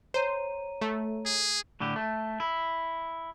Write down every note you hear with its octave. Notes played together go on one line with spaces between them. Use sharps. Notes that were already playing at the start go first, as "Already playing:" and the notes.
C5 C#5 A#5 D#7
A3
G#4
A2 D3 G4
A3
E4